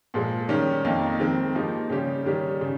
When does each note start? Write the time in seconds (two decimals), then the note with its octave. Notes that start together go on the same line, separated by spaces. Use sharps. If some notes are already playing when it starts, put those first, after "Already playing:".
0.14 A#2 F3 G#3
0.49 D#3 G3 C#4 G4
0.85 F2 D#3 A#3 D#4
1.20 D#3 G#3 C4
1.55 F3 A#3 D#4 G4
1.90 C#3 G3 C#4 G4
2.26 D#3 G3 C#4 G4
2.61 C#3